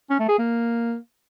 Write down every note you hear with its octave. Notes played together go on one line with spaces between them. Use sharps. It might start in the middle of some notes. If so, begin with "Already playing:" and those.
C#4
A3
G#4
A#3